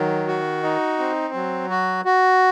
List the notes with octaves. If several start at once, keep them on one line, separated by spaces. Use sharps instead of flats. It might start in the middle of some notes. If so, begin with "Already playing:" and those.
Already playing: D#3 F#3
F#4
D#4
C4
F#3
F#4
F#4